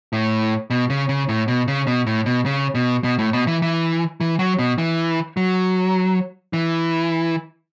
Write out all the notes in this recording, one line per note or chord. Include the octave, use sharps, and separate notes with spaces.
A2
B2
C#3
C#3
A2
B2
C#3
B2
A2
B2
C#3
B2
B2
A2
B2
E3
E3
E3
F#3
B2
E3
F#3
E3